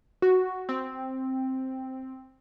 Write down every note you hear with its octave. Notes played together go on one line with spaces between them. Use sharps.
F#4
C4